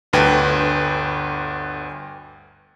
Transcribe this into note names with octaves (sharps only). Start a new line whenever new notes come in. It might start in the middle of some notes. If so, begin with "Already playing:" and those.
G1 D2 B4 G5